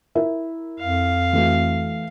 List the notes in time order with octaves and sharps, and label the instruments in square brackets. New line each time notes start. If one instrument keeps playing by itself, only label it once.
[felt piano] E4 A#4 E5
[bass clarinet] F2 [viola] F5
[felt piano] E3 A3 F#4